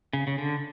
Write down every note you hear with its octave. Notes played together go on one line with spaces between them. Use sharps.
C#3
C#3
D3